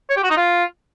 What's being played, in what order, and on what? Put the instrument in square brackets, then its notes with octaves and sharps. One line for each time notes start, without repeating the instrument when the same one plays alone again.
[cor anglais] C#5
G4
F#4
D#4
F4